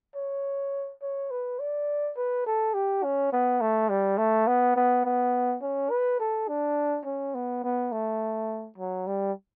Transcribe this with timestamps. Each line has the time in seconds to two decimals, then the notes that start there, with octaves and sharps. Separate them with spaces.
0.15 C#5
1.02 C#5
1.31 B4
1.60 D5
2.17 B4
2.47 A4
2.74 G4
3.04 C#4
3.33 B3
3.61 A3
3.90 G3
4.18 A3
4.47 B3
4.76 B3
5.05 B3
5.62 C#4
5.90 B4
6.20 A4
6.48 D4
7.06 C#4
7.35 B3
7.64 B3
7.92 A3
8.78 F#3
9.07 G3